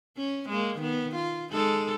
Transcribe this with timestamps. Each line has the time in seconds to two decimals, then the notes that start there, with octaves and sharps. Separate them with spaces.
0.17 C#4
0.49 G#3 A#3
0.78 D#3 B3
1.15 F4
1.52 G#3 D#4 A4